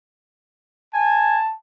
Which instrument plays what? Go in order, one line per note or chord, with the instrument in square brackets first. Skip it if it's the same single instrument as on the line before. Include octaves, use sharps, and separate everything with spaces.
[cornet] G#5 [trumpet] A5